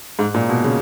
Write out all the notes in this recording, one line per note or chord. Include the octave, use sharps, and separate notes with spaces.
G#2
A#2
B2
C#3